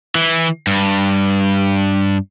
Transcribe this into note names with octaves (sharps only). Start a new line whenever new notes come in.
E3
G2